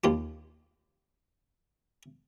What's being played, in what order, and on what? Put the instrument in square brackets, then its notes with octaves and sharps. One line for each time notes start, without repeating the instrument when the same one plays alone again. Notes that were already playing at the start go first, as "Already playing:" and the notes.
[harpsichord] D#2 F4 G4